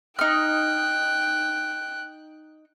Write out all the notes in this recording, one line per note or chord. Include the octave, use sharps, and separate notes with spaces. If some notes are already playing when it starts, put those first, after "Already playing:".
D#4 G5 F6 F#6